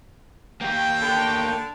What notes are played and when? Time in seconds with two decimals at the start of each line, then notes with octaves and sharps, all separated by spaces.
0.62 A#3 G4 G5
1.01 D3